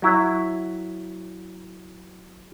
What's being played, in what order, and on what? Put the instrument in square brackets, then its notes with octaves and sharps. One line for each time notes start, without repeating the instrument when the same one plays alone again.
[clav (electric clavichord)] F#3 E4